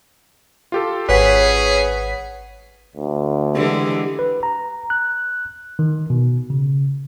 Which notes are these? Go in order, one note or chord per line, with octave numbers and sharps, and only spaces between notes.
F4 G4 A4
G#1 C#4 G#4 B4 C#5 F#5 B6
D2
D3 E3 G#3 G4
B4
A#5
F#6
D#3
B2
C#3